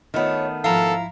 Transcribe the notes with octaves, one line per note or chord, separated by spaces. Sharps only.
D#3 A3 B3 F4 C#5
G#2 F3 E4 A4 F5 A#5